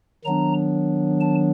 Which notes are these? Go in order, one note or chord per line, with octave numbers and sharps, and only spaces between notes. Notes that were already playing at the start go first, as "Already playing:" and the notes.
D#3 F#3 B3 D4 A#5
A5